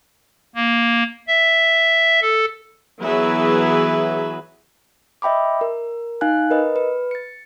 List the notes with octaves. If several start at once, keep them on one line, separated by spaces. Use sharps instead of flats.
A#3
E5
A4
E3 F#3 B3 G#4 B4 E5
D#5 E5 G5 B5 D6
A#4
D#4 F5 G#5 F#6
A#4 B4 D#5
B4
A6 C#7